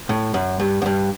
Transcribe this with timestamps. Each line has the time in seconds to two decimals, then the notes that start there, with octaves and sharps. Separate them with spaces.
0.09 A2
0.34 F#2
0.60 G2
0.82 F#2
0.86 G2